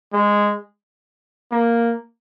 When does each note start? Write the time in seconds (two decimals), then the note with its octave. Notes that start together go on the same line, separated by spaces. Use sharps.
0.13 G#3
1.51 A#3